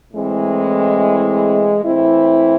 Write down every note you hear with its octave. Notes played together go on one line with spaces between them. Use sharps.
A2 E3 G#3 C4
A2 E3 C4 E4